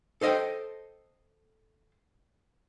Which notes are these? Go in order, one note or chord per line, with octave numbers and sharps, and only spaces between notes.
A4 C5 D#5 F5 G5